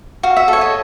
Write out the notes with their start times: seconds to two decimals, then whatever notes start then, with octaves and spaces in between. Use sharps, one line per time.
0.23 F#4 F5
0.37 E5
0.48 A4 C#5
0.61 D#5